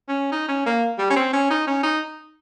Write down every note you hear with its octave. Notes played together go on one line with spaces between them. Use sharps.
C#4
D#4
C#4
A#3
G3
C#4
C4
C#4
D#4
C#4
D#4